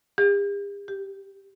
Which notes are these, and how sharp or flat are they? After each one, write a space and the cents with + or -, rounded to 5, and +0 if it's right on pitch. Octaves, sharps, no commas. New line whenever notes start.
G4 +45
G4 +0